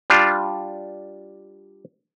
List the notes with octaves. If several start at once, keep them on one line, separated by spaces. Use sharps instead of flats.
G3 D4 F4